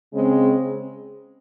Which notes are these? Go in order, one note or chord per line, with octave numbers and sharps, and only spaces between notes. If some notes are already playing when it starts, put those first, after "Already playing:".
C#3 G#3 C4